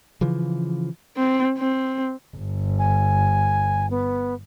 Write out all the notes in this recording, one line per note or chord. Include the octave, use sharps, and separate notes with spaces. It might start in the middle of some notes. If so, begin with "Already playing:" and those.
C#3 E3 F3
C4
C4
G1
G#5
B3